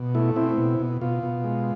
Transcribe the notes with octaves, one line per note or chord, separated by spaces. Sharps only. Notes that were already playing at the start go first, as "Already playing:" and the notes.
Already playing: B2
A3 E4
C4 E4
B2
B2
B2 F4
B2
G#3